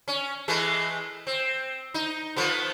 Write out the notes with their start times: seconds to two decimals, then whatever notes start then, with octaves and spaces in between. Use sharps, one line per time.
0.08 C#4
0.48 E3 G#3 A3
1.27 C4
1.94 D#4
2.36 F3 A3 B3